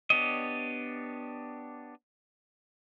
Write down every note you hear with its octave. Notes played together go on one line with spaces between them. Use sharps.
B3 D4 G4 C#5 D#5